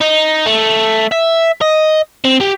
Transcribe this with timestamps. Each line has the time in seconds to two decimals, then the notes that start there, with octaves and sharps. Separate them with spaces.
0.01 D#4
0.46 A3
1.11 E5
1.61 D#5
2.25 C4
2.41 G4